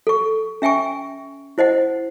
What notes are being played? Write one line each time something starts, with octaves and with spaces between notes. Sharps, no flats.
A4 C#6
C#4 E5 G5 G#5 C#6
E4 C5 D#5 F#5